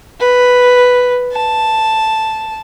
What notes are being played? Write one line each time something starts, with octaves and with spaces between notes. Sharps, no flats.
B4
A5